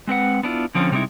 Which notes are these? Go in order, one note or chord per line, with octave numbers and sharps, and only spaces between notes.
G#3 C4 B4 F#5
B3 D4 E4 F4
D3 F3 C4 C#4
C3 G3 G#3 C4 D#4 E4